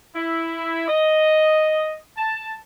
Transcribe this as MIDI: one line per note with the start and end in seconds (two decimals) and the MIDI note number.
0.15 0.87 64
0.88 1.97 75
2.17 2.54 81